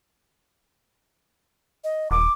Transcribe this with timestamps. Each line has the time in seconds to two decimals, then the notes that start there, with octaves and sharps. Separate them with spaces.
1.84 D#5
2.11 D#1 D6